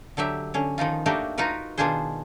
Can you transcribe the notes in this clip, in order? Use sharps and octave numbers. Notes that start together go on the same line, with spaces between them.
D3 F#3 G4 E5
D3 C#4
D#3 F3 D#4 F4
A3 A#3 D4 D#4 F#4 G4
D#4 F4 F#4 A#4 B4
B2 D#3 D4 F4 G#4 C5